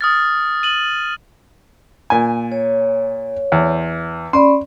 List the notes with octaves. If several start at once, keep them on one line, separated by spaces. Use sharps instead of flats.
D#6 F6 A6
D#7 F#7
A#2 G#5
C#5
E2
C#4 D5 B5 C6